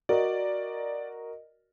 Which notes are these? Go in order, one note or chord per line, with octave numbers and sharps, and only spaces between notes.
F#4 A#4 D5 D#5